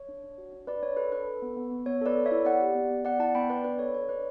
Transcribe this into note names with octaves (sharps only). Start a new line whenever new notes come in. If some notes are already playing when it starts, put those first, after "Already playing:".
Already playing: C#5
D4
D4
F#4
D4
D4 B4 D5
D4 C#5
A4 B4
D4 B4
A4
B3
B3
B3
B3 C#5
A4 B4 D5
A4
C#5 E5
E4
B3 D5 F#5
G4
B3
B3
B3 D5 F#5
E4 F#5 A5
B3 G5 B5
B3 B4 D5
D4 B4
A4 C#5
D4 C#5
D4 B4 D5